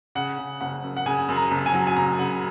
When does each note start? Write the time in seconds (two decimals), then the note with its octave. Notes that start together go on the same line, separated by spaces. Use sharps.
0.15 C#3 F#5
0.38 C#3
0.61 F#1 F#5
0.83 F#2
0.97 F#5
1.06 C#3 G#5
1.29 F#2
1.36 A#5
1.51 F#1
1.66 G#5
1.73 F#3
1.87 G#5
1.96 F#1 A#5
2.19 C#3 F#5